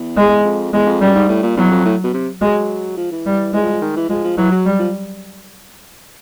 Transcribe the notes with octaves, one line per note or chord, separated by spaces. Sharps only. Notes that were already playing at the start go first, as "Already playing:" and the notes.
Already playing: E2
G#3
F2
E2 G#3
F2
F#2 G3
G#2
A2
A#2
E2 F#3
F2
A2
B2
C3
F#3 G#3
F3
E3
G3
E3 G#3
F3
F3
D#3
E3
F3 G#3
F3
E3 F#3
F#3
G3
F3